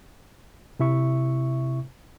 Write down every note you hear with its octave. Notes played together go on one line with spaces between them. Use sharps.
C3 E4 E5 C#6